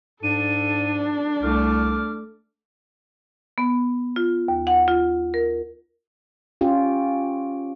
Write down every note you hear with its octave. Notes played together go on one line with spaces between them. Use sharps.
G#2 D4 A4 D#7
C2 A3 D6 F6
B3
F4
D#2
F#5
F4
A#4
C#4 F4 G4